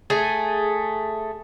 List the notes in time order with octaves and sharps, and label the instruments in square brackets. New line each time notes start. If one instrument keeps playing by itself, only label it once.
[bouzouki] A3 G#4 G#5